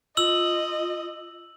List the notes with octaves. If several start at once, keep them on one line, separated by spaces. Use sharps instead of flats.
F4 D#5 E6 F#7